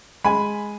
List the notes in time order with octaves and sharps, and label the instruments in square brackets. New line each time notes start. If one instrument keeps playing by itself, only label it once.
[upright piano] G#3 G#5 B5